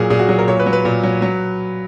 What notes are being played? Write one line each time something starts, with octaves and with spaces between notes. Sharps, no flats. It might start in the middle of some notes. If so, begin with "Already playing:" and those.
Already playing: A#2 F#3 G#4 A#4
A#2 G#4
F#4
F#3 G#4
A#4
A#2 C#5
B4
F#3
B4
A#2
F#3
F#3